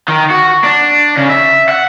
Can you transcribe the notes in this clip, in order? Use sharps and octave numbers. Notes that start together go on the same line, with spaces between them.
D#3
F#4
D4
C#3
E5
F#5